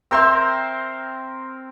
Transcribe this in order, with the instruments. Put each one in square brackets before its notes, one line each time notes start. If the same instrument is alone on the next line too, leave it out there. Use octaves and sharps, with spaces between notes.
[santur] C4 A#4 C5 [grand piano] E5 C6 E6